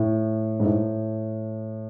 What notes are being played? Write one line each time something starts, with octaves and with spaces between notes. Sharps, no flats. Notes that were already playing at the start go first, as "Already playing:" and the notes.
Already playing: A2
G#2
A2